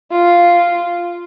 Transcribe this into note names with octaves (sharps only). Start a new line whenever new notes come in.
F4